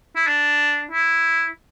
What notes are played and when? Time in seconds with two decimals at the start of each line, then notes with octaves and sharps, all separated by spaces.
0.16 E4
0.27 D4
0.91 E4